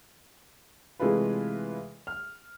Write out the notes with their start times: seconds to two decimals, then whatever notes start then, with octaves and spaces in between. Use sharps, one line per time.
1.00 C3 E3 G#3 A3 F4 B4
2.07 F6